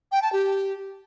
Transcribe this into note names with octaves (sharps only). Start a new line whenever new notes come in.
G5
A5
G4